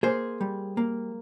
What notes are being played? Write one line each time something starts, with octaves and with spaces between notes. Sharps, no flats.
A#3 G#4 C5
G3
A#3